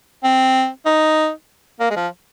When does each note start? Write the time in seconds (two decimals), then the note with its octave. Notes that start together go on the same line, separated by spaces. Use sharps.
0.24 C4
0.86 D#4
1.80 A#3
1.91 G#3
1.96 F3